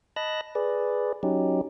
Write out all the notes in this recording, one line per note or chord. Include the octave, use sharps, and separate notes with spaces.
D#5 A5 B5 F#6 A#6
G#4 B4 D5
F#3 C#4 D#4 G4